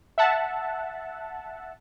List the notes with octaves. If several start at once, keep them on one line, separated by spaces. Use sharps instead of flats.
E5 F#5 A5